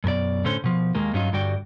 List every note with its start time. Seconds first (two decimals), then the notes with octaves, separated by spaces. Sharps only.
0.04 F#2 B2 A#4 D5
0.44 A2 D3 C#4 A4 C5
0.64 B2 F3
0.95 D#2 D#3 G#3 A#3
1.13 G2 F#3 C#4 D#4 F4
1.33 G2 D3 G3 F#4 D5 G5